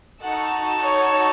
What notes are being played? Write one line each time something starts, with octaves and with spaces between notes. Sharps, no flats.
D#4 F#4 A4 F#5
C#5